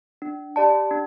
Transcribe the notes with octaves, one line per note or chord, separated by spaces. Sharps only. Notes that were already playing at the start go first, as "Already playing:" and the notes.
D4
G4 D5 A5
D4